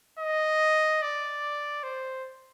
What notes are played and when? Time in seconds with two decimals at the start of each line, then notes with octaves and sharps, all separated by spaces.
0.19 D#5
1.02 D5
1.83 C5